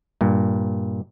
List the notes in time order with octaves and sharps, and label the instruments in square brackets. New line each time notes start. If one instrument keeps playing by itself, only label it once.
[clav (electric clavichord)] G2 A#2